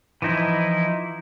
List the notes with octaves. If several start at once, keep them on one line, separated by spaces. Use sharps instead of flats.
E3 F3 D#4 E4